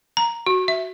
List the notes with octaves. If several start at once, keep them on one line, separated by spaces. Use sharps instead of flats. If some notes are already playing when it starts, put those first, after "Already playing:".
A#5
F#4
E5